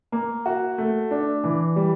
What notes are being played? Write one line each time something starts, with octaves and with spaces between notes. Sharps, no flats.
A#3
F#4
A3
D4
E3
G3